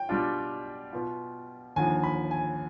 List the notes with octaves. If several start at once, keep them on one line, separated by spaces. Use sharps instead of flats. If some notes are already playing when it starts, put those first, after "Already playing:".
Already playing: G5
B2 G3 D4 F4
B2 B3 F4
D#2 D3 F3 G#5
B5
G#5